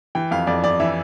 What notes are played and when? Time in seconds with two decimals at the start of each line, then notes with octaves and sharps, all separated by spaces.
0.15 E3 G5
0.31 F2 F5
0.47 F2 D5
0.64 F2 D5
0.80 E3 E5